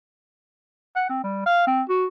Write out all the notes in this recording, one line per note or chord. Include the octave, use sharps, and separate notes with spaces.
F#5
C4
G3
F5
C4
F#4